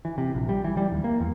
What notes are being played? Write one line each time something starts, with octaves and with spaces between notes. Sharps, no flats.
E3
C3
A#1
G3
E3
G3
D#2
A#3
E2